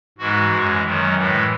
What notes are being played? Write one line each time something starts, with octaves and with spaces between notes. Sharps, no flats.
G#2 E3 G#3 F#4
F#2 E3 G#3
F#2 D#3 F#3
A2 E3 G#3